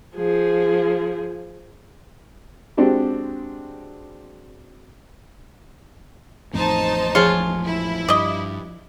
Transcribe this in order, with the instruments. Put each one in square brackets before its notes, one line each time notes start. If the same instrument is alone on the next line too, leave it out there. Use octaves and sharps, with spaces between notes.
[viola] F3 G#4
[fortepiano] G#3 C4 D4 F#4 G4
[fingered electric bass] A1 F2 A2 [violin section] D#4 C5 A5
[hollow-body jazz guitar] F3 G#4 C#5 [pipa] F4
[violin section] E4
[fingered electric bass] G2 [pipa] D5 D#5